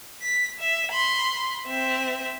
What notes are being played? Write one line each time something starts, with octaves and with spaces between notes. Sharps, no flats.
B6
E5
B5 C6
C4 E5